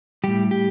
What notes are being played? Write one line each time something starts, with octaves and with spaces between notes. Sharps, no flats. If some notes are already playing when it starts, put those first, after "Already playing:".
A2 G3 G4
G4